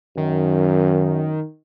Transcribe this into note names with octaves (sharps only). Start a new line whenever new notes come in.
F#2 D#3